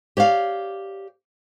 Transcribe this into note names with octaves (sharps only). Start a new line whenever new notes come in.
G4 C#5 D5 F5